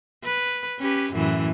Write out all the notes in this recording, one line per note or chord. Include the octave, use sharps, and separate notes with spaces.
B4
C#4 G4 B4
F#2 A2 E3